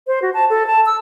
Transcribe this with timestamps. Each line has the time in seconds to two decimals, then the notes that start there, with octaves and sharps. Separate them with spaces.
0.07 C5
0.22 F#4
0.34 A5
0.50 A4
0.67 A5
0.86 E6